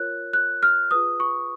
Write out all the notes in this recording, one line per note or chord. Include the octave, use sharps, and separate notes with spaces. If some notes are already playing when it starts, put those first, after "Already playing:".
Already playing: F4 A#4 C#5 F#6
F#6
F6
F4 G#4 B4 D#6
C#6